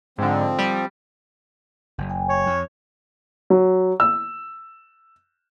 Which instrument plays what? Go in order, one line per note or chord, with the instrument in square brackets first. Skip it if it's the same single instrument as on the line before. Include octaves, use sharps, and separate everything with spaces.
[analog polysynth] G#2 D3 [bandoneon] F3 C4
[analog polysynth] G3
[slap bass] F#1
[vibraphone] G5 G#5
[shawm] C#5
[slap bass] F2
[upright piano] F#3
E6